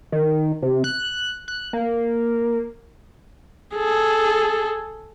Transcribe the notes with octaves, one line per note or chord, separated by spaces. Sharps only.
D#3
C3
F#6
F#6
A#3
G#4 A4